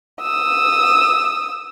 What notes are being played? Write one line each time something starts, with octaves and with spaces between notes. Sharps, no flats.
D#6 E6